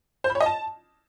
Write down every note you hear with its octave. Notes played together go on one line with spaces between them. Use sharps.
C5
B5
C#5
D#5
A5